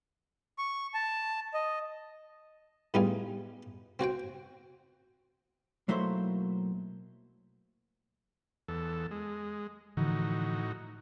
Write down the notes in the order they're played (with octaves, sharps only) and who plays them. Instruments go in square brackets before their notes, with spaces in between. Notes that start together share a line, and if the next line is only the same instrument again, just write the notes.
[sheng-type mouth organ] C#6
A5
D#5
[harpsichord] A2 G3 B3 D#4 F4 G#4
C4 F#4 C5 G5
[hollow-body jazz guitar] B1 F#3 A3 A#3 E4 C5
[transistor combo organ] E2 A4
G#3
[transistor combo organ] A2 D#4 F#4 [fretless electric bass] D3 E3 F3